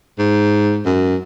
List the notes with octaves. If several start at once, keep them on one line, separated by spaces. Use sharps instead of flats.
G#2
F#2